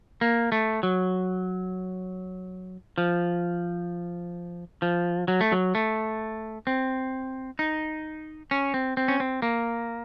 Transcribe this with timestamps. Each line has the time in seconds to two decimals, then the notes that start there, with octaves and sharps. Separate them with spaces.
0.21 A#3
0.52 A3
0.83 F#3
2.98 F3
4.82 F3
5.28 F#3
5.41 A3
5.52 F#3
5.75 A3
6.67 C4
7.59 D#4
8.51 C#4
8.74 C4
8.97 C4
9.08 C#4
9.20 C4
9.42 A#3